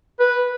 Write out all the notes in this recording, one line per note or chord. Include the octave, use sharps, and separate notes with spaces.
B4